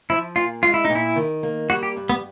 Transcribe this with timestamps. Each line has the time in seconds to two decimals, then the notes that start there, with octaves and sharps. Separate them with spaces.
0.10 F3 E4
0.36 A#2 F4
0.63 G#3 F4
0.74 E4
0.85 A#2 D#4
0.95 E4
1.16 D#3
1.43 A#3
1.70 G3 F#4
1.83 G4
1.96 G2
2.09 B3